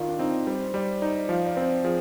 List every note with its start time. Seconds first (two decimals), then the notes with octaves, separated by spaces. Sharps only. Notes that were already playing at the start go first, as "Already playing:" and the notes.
Already playing: D#3 F4 A#4 D5
0.08 D4
0.19 C4 D#4
0.47 G3 C5
0.74 G3 D5
1.01 D#4 D5
1.29 F3 F5
1.46 D5
1.57 C4 C5
1.84 F3 G#4